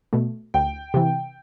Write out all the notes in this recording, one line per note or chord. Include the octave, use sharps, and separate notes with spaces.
B2 A3
D2 G5
C3 E3